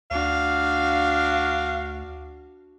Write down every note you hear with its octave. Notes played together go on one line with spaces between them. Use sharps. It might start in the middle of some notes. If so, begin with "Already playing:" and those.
D2 D4 F#4 F5